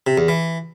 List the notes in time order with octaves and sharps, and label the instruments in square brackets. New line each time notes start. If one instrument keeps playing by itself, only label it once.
[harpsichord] C3
E2
E3